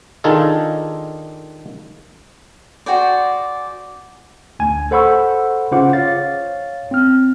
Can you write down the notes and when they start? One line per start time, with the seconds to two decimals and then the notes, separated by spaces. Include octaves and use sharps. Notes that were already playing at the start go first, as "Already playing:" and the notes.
0.24 D#3 D4 D#4 F4 G#4 A4
2.86 F#4 G#4 C5 D5
4.59 D2 G#5
4.91 A4 C5 F#5 B5 C#6 E6
5.71 C#3 F4 C5 F#5 D6
5.93 C#5 F5 A6
6.91 C4 F6